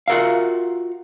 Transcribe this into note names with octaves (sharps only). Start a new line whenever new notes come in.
F4 F#4 A#4 E5 F5